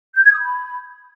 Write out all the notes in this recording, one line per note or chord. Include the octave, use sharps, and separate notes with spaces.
G6
G#6
D#6
B5